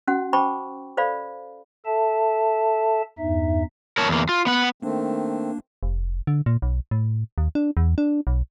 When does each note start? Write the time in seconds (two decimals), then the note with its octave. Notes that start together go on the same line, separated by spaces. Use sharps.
0.07 C#4 F#4 F#5
0.33 C5 G5 A5 B5 C#6 D6
0.97 A4 C5 D5 F5 B5
1.85 A4 E5 A5
3.18 E2 G2 D#4 E5
3.98 A#4 C#5 A5
4.09 E2 A#3
4.29 F4
4.46 B3 F#5
4.83 D#3 A3 A#3 C4 D4
5.83 F1
6.27 D3
6.46 A#2
6.62 B1
6.91 A2
7.38 D#2
7.55 D4
7.77 E2
7.98 D4
8.27 B1